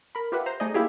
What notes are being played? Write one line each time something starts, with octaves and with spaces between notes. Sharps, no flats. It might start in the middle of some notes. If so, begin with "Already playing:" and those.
A#4 B5
F4 G4 B4 E5 F#5
C5 A#5
A3 D#4 G#4 D5 D#5
A#3 E4 F4 G4 G#4